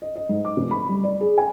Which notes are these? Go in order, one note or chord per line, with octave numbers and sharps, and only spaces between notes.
D#5
D#5
G#2
D6
F1
B5
G3
D5
G#4
G#5